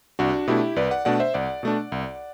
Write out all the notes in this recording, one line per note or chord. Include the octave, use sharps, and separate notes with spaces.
C2 D4 F#4
B2 A3 D4 E4 G4
C2 B4 D5
D5 F#5
B2 A3 D4 D5 F#5
C5 E5
C2 D5 F#5
B2 A3 D4
C2